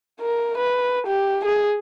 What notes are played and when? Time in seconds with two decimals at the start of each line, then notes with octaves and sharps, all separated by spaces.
0.21 A#4
0.57 B4
1.07 G4
1.45 G#4